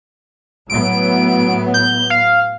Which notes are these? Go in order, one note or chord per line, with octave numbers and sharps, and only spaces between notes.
A2 F#3 B3 D7
G6
F5